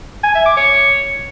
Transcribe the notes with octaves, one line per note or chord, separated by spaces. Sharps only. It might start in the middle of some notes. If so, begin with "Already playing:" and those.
G#5
E5
D6
C#5